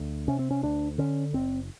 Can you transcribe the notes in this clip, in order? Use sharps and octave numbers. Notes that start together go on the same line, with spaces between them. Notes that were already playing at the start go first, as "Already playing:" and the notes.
Already playing: D2
C3 C#4
C4
C#4
D2 D4
D3 C#4
F#1 C4